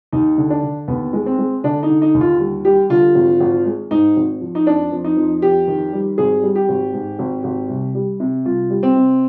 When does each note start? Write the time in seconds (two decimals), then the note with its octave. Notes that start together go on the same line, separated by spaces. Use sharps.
0.12 D#2 D#4
0.38 D3
0.50 D4
0.63 D3
0.88 D#2 B3
1.13 G#3
1.26 C4
1.38 G#3
1.64 D3 D4
1.83 D#4
1.89 D3
2.02 D#4
2.14 D#2
2.21 F4
2.39 G3
2.65 G3 G4
2.90 D3 F4
3.15 G#1
3.40 G#1
3.66 G#3
3.91 G#2 D#4
4.17 G#1
4.41 F3
4.55 D#4
4.67 F2 D4
4.92 F2
5.04 D#4
5.17 F2
5.42 F2 G4
5.68 D#3
5.93 G3
6.18 G#1 G#4
6.43 G3
6.55 G4
6.69 G#1
6.93 G#2
7.19 G#1
7.44 G#1
7.69 C2
7.95 G3
8.20 C3
8.45 C2 F4
8.70 G3
8.83 C4
8.96 C3